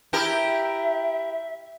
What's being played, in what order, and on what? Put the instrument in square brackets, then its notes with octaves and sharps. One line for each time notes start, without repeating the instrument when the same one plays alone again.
[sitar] E4 G4 A#4 [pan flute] E5